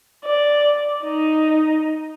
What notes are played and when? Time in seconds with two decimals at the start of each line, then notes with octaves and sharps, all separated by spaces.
0.25 D5
1.03 D#4